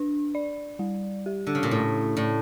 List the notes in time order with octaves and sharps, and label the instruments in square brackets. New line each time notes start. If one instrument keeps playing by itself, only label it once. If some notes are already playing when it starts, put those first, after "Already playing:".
Already playing: [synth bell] D4
D5
G3
G4
[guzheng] D3
C#3
A#2
[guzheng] A2 [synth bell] E4
[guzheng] A2 [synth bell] D5